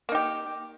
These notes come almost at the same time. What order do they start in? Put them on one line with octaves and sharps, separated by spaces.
A#3 D#4 G4